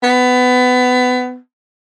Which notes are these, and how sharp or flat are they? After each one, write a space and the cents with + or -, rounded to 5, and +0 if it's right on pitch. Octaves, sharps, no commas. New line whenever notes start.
B3 +20